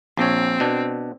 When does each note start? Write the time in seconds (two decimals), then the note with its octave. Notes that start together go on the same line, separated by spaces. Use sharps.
0.17 A#1 C4 C#5
0.60 B2 D4